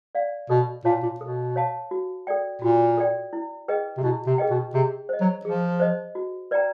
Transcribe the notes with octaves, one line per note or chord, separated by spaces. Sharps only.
D5 F5
B2 A4
A#2 C#5 F5 A5
A#2
B2 A4
C#5 F5 A5
F#4
A4 D5 G5
A#2 F#4
A4 D5 G5
E4
G#4 B4 D#5 G5
C3
B2 E4
C3
G#4 B4 D#5 G5
B2
C3 G#4
C5 D#5
F#3
F3 G#4
C5 D#5
F#4
B4 D5 G5 A#5